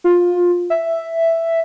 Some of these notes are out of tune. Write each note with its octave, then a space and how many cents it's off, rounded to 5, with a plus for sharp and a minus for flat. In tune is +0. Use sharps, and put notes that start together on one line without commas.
F4 +15
E5 +5